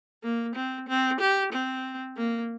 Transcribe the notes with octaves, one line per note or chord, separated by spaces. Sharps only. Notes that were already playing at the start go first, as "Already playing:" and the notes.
A#3
C4
C4
G4
C4
A#3